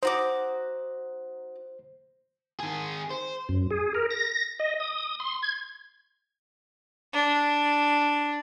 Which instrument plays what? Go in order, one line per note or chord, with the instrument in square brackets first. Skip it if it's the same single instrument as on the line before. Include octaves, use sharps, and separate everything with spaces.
[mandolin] D#4 F#4 D6 [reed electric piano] C5
[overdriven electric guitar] D#3 G#4
C5
[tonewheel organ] F#2
G#4
A#4
A#6
D#5
D#6
C6
G#6
[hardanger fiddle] D4